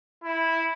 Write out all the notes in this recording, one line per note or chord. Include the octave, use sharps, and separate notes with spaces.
E4